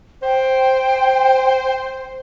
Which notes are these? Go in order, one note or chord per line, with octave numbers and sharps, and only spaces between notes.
C5 G5